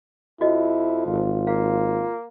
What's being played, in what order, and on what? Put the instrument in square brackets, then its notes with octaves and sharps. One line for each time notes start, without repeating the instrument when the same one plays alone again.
[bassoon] F2 [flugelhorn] E4 [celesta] F#4 D#5
[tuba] G#1 [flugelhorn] F4
[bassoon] A#3 [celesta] F5